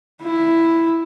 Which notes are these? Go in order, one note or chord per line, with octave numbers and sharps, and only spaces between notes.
E4